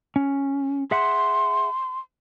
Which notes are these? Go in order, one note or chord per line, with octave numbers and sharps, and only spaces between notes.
C#4
G#4 E5 F#5 C6